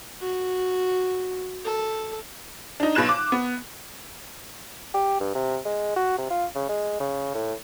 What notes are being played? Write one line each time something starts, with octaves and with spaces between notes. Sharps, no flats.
F#4
A4
D4 D#4
B1 B2 B4 F#6 E7
D6
B3
G4
G2
C3
G#3
F#4
C3
F4
C#3
G#3
C#3
A2